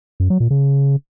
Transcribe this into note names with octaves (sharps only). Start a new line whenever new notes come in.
F#2
F#3
A#2
C#3